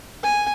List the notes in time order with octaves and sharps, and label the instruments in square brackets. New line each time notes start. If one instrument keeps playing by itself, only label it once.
[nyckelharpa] G#5